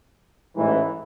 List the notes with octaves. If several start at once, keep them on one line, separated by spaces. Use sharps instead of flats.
A1 G#2 E3